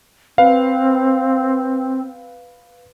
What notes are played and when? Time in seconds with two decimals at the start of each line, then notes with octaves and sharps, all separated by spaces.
0.38 C4 B4 F5